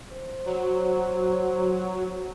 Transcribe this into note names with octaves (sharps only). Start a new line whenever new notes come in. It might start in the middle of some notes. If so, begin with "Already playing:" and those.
C5
F#3